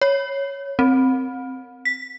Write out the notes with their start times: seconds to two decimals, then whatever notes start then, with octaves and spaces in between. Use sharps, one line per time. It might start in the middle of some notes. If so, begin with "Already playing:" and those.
0.01 C#5
0.79 C4
1.85 B6